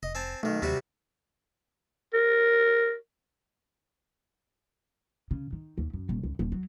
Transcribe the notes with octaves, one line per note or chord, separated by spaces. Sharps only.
F1 D#5
C4 G#5 A5
B1 D#3 A3
D#2 C3 G3 F#4
A#4
C#3
D#3
D#2
F#2
D#1
C#2
D#1
F#3